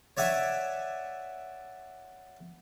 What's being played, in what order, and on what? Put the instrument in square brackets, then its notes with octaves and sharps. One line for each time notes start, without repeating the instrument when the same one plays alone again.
[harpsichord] C#5 D5 E5 F#5 G#5 C#6